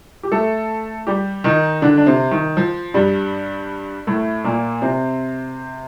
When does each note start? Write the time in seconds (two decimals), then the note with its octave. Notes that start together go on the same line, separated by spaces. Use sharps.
0.23 G4
0.32 A3 A4
1.07 G3 G4
1.44 D#3 D#4
1.82 D3 D4
1.97 D4
2.06 C3 C4
2.31 D#3
2.57 F3
2.94 G2 G3
4.07 A2 A3
4.44 A#2 A#3
4.82 C3 C4